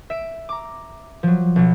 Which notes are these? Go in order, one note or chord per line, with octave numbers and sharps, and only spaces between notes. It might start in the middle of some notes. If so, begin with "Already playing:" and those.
E5 D7
A#5 D6
F3 F#3
B1 B2 F#3